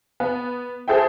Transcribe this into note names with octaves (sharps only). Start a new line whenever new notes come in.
B3
G#4 A4 C5 E5 G5